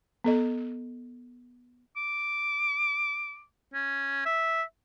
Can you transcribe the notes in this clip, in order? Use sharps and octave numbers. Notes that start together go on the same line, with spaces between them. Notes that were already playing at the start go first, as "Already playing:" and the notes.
B3 A4 D#5
D6
C#4
E5